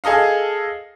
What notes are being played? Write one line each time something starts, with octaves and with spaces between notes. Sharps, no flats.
G#4 A4 D#5 F5